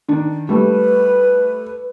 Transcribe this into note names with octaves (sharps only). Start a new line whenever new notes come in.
D#3 D4
G3 A3 B4